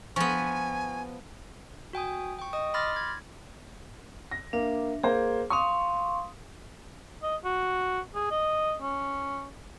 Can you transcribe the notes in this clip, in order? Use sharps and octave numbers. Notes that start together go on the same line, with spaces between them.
F3 B3 G#5 C#6
F#4 G5 G#5 D#6
G5 C#6
D#5 D#6
B5 C6 D6 F6 A6 A#6
G#6
A#6
A#3 D4 E5
A#3 G#4 C5
F5 C6 C#6 D#6
D#5
F#4
G#4
D#5
C#4